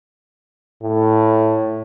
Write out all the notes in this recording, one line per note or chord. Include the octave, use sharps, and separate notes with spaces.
A2